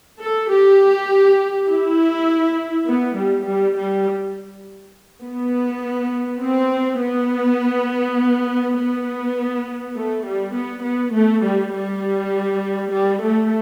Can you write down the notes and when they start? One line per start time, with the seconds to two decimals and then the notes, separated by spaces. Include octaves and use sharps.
0.21 A4
0.51 G4
1.68 E4
2.87 B3
3.16 G3
3.45 G3
3.76 G3
5.23 B3
6.42 C4
7.00 B3
8.78 B3
9.95 A3
10.26 G3
10.54 B3
10.84 B3
11.13 A3
11.44 G3
11.73 G3
12.91 G3
13.21 A3